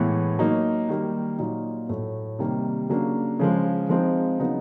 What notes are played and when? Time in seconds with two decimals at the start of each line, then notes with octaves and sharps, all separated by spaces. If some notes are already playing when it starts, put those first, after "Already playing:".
Already playing: A2 E3 G#3 B3
0.39 F#3 A#3 D#4
0.89 D#3 G3 A#3
1.39 A#2 F#3 A#3 D#4
1.89 A2 F#3 A3
2.39 C3 D#3 G3 A#3
2.89 C#3 F#3 A#3 D4
3.39 C#3 F3 G#3
3.89 F3 G#3 C4 D#4
4.39 C#3 F#3 B3 D#4